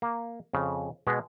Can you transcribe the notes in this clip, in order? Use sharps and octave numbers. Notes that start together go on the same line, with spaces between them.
A#3
F2 C#3
B2 G#3 B3